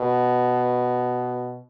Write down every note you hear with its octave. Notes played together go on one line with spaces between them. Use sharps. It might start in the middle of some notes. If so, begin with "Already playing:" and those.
Already playing: B2